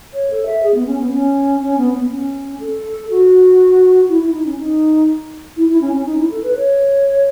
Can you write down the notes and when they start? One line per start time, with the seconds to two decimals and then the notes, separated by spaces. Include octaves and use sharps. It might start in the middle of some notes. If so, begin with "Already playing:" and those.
0.14 C#5
0.30 A4
0.46 E5
0.63 G#4
0.74 B3
0.87 C#4
1.00 B3
1.12 C#4
1.62 C#4
1.78 B3
1.95 B3
2.11 C#4
2.60 A4
3.10 F#4
4.09 E4
4.21 E4
4.33 D#4
4.45 C#4
4.58 D#4
5.57 E4
5.68 E4
5.81 C#4
5.93 C#4
6.06 D#4
6.18 E4
6.31 A4
6.43 B4
6.56 C#5